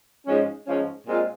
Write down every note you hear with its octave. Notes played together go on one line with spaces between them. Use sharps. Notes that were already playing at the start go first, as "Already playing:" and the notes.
G#2 F3 G#3 C#4
G#2 F3 G#3 C#4
A#2 G#3 C4 F4